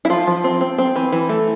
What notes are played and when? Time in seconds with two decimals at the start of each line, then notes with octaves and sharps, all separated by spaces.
0.05 E4
0.10 F3 F4
0.27 F3
0.44 C4
0.61 C4
0.78 C4
0.96 E3
1.12 E3
1.29 A3